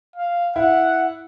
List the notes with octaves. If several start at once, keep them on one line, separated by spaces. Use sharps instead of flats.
F5
E4 F#5